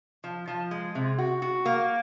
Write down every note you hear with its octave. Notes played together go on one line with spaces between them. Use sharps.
F3
F3
G#3
C3
F#4
F#4
A#3